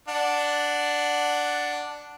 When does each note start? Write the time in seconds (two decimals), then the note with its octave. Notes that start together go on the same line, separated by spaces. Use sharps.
0.08 D4 F#5